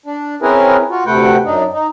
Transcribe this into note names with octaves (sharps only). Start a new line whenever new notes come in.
D4
C4 C#4 E4 G#4 A#4 B4
F4 F#4
D2 C3 A3 B4 F#5 G5
F#2 D4 D#4
D#4